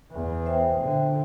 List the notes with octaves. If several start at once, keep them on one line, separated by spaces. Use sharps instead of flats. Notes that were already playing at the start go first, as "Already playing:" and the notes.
E2
C5 E5 G5
A#2 D3